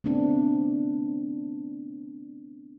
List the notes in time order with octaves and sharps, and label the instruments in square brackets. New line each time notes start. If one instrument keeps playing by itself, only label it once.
[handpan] A3 B3 C4 D4